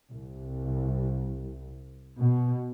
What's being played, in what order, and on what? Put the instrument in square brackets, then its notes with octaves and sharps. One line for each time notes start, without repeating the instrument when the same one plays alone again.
[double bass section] C2
B2